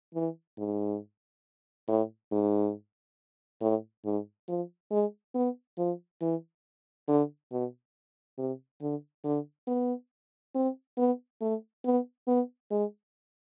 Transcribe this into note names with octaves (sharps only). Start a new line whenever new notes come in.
E3
G#2
A2
G#2
A2
G#2
F3
G#3
B3
F3
E3
D3
B2
C3
D3
D3
B3
C4
B3
A3
B3
B3
G#3